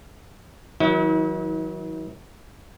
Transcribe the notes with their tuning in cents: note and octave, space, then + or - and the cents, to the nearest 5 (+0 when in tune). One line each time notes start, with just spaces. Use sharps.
D#3 +40 F#3 +0 E4 -45